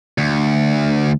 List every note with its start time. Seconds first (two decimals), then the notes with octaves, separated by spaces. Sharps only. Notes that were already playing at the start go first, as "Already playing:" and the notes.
0.18 D2